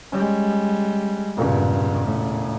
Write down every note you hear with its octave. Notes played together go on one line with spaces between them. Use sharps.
G3 G#3 C#4
E1 G2 A#2 C#3
A2